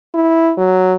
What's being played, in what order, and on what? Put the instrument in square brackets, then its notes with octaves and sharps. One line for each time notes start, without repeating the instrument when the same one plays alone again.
[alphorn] E4
F#3